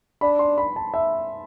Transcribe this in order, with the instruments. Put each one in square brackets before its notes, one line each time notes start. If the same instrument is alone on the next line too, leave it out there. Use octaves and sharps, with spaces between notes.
[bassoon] D4 [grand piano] B5
[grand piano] C6
B5
A5
E5